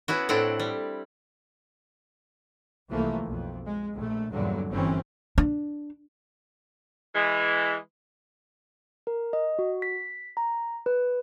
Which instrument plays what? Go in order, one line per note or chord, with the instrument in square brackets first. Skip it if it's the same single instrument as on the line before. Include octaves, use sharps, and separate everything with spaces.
[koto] B3 C#4 E4 F#4
A2 C4 D4 E4 D5 F#5
G3
[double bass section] C2 E3 F3 A3 A#3
B1 F2
G#3
A#1 A3
E2 G2 A#2 D3 F#3
G1 F#2 E3 C4 C#4
[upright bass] D4
[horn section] E3 G#3
[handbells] A#4
D#5
F#4
B6
A#5
B4